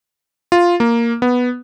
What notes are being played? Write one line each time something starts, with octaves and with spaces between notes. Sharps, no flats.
F4
A#3
B3